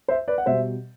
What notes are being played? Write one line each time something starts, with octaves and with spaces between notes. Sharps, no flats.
C5 E5
B4 D5
F#5
B2 G3 C5 E5